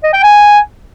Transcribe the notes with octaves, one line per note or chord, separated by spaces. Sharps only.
D#5
G5
G#5